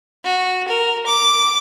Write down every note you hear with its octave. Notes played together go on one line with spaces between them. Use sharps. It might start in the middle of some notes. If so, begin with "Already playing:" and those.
F#4
A#4
D6